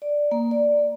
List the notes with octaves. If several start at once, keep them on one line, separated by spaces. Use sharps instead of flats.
D5
A#3
D5